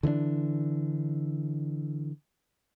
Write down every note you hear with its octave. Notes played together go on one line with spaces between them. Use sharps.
D3 E3 B3 D4